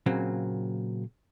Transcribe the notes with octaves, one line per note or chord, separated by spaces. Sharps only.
A#2 C#3 F#3 A#3 C4